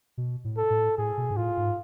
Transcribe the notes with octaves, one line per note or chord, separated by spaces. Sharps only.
B2
A2
A4
A2
A2 G#4
B2
G#2
A2 F4
G#2